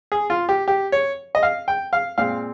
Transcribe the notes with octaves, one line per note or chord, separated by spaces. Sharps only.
G#4
F4
G4
G4
C#5
D#5
F5
G5
F5
A#2 G#3 C4 F5